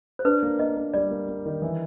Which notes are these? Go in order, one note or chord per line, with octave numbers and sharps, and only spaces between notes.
C5
D4 B4
A#3
A#3 D#5
A#3
G3 D5
A#3
A#3
D#3
E3